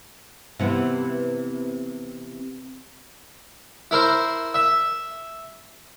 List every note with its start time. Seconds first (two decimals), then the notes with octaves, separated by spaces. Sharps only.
0.59 C3 E3 B3
3.91 E4 A#4 C5
4.54 E5